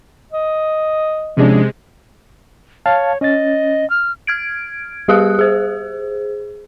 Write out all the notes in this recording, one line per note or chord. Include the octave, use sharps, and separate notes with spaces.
D#5
C3 F3 G#3 C#4 D4
C#5 F5 A5
C#4 D#5 A6
F6
F6 G#6 D7
G3 G4 G#4 F5 D#6 F#6
G#4 C5